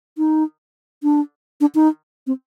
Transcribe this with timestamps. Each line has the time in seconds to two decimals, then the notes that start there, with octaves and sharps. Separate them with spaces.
0.18 D#4
1.03 D4
1.61 D4
1.75 D#4
2.27 C4